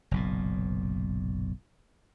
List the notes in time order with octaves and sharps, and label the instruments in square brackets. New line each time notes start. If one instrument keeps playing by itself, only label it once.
[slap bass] F#1 B1 A#2